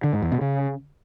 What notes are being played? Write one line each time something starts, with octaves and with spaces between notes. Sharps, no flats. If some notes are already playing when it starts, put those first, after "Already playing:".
D3
G#2
E2
B2
C#3